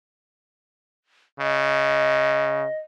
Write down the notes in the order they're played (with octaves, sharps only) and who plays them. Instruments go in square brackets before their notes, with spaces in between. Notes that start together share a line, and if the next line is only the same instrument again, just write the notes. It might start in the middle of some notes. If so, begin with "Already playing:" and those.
[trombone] C#3 [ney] D#5